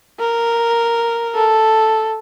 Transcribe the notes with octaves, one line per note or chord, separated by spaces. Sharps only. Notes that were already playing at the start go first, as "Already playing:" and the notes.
A#4
A4